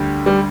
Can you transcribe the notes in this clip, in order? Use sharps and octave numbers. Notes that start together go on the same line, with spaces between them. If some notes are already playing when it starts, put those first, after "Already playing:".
Already playing: D2 D3 G3 D4 G4
G3